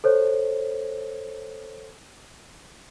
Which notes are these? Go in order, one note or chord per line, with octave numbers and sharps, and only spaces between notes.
A4 C5 C#5